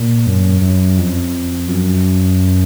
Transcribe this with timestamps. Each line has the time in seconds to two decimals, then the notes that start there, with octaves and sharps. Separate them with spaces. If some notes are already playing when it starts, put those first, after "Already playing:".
Already playing: A#2
0.26 F#2
0.61 F#2
0.98 F2
1.67 F#2